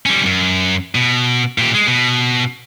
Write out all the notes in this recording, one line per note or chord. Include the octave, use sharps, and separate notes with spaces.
G3 C#4
F#2
B2
A#2 G4
G#3
B2